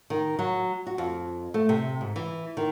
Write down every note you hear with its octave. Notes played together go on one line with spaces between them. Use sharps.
D#3
F#3
F#4
F2
A3
C3
G#2
E3
D#3